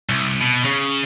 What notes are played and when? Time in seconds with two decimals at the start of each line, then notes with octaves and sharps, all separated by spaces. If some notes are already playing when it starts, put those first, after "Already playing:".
0.09 C2
0.41 B2
0.65 C#3